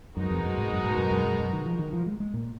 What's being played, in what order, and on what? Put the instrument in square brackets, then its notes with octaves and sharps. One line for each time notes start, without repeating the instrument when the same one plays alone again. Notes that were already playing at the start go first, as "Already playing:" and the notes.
[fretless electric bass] F#2 [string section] B2 G#3 D#4 F#4 A#4
[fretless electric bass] F2
F#2
G#2
F#2
G#2
F#2
F#2
F#2
F#2
D#3
F3
D#3
F3
G#3
G#3
A#2